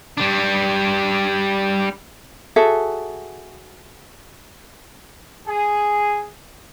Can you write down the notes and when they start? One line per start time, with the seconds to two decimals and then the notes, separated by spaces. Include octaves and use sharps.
0.17 G3 D4
2.56 F#4 G#4 A4 E5
5.47 G#4